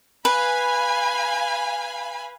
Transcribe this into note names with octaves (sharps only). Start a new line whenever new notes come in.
B4 F5 G#5 B5